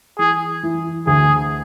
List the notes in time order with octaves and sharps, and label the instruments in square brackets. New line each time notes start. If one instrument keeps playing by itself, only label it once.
[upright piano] E3 [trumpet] G#4
[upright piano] E3
[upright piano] D2 [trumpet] G#4